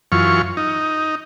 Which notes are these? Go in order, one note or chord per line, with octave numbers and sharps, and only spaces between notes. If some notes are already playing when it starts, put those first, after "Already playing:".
F#2 E3 F4 C#6
D#4